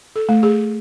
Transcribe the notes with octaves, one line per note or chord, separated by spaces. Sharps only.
A4
A3
G#4